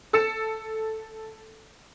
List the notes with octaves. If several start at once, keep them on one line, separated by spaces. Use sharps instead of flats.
A4 E6 A6 C#7 E7